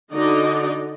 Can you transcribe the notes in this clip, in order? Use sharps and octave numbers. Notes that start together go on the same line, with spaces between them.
D3 D#4 F#4 D5 D#5